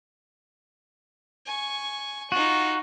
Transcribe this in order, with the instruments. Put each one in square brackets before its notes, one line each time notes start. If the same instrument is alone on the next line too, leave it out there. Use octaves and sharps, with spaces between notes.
[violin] G#5 C#6
[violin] D#4 F4 [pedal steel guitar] F#4